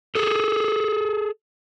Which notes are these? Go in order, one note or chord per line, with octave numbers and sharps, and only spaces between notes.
G#4 A4